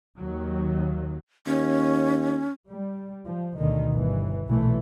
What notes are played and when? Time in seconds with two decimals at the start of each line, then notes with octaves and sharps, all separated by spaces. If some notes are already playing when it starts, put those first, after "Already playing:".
0.18 D#2 D#3 F#3
1.47 D#2 C#4
2.70 G3
3.27 F3
3.57 D2 B2 D3 D#3
3.93 G1 E3
4.47 B1 A#2 E3 A3